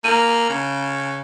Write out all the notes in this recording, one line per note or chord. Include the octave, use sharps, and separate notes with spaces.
A#3 D#7
C#3